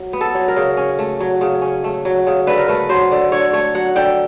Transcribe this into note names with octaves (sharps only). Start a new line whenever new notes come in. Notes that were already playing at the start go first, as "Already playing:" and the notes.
Already playing: F#3
B3
A4
F#3
A#4
C#3
C#4
A3
F#3
C#3
C#4
A3
F#3
C#3
D3 B4
A#4
A3 B4
F#3 C5
D3
D3 C#5
A3 C#5
F#3 F#5
D3 G5